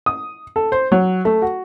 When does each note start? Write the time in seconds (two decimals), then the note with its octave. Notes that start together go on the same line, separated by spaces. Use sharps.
0.06 D#6
0.56 A4
0.72 C5
0.92 F#3
1.25 A3
1.42 F#4